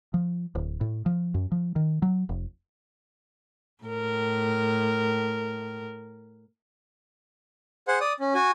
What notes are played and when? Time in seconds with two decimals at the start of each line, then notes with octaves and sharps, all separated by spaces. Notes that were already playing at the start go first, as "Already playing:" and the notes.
0.14 F3
0.55 D1
0.81 A2
1.06 F3
1.34 F#2
1.52 F3
1.76 D#3
2.02 F#3
2.29 F1
3.84 A2 A#4
7.88 G#4 C5 F#5
8.01 D5 D#6
8.20 C#4
8.34 F#4 G#5